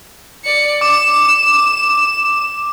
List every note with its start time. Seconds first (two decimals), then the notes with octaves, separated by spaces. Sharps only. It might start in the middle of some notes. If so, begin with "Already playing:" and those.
0.44 D5 C#7
0.81 D6 E7